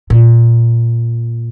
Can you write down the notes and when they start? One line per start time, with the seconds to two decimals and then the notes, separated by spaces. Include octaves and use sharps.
0.10 A#2